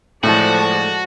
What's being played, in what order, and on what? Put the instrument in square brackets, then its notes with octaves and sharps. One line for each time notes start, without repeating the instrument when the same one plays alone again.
[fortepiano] A2 [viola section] F3 G#3 D5 [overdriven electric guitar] F#4 [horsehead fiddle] A4 A5